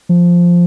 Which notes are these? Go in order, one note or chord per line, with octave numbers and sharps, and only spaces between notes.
F3